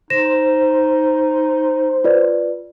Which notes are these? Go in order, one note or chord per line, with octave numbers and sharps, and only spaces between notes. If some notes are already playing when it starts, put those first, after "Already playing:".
D#4 C5 A#6 E7
F4 B4 D5